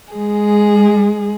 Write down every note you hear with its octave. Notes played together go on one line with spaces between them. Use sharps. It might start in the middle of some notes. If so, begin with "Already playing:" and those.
G#3 G#4